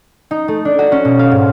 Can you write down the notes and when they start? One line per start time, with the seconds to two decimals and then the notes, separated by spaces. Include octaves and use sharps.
0.31 D#4
0.48 A3
0.65 D4
0.79 F#4
0.92 C#4
1.05 B2
1.19 F5
1.31 G#2